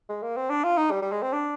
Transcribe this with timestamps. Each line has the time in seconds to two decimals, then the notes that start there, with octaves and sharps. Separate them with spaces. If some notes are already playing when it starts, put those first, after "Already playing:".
0.09 G#3
0.23 A#3
0.37 C4
0.50 D4
0.64 F4
0.78 D#4
0.91 G3
1.02 G3
1.12 G#3
1.22 C4
1.33 D4